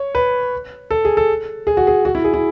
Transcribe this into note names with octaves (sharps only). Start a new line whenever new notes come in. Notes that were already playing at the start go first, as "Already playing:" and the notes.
Already playing: C#5
B4
A4
G#4
A4
G#4
F#4
G#4
F#4
E4
G#4
E4